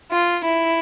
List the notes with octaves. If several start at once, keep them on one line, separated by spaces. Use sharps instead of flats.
F4
E4